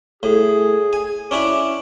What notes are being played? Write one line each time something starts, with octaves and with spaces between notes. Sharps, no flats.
A2 G#4
G#5
C#4 D4 E4 D6